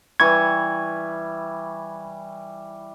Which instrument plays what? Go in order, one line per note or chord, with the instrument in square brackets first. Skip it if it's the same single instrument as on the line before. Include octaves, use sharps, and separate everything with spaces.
[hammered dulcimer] E3 G3 C#6 [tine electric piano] G#6